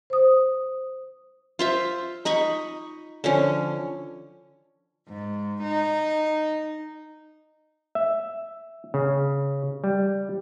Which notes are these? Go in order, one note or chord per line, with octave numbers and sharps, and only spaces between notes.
C5 D#6
F4 C5 E5
D#4 D#5 B5 C#6
D3 F3 C#4
G#2
D#4
E5
C#3
G3